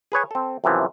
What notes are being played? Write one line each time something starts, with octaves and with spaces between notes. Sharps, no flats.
G#4 B4 C#5 G#5
C4 A4
F#2 C3 E3 F3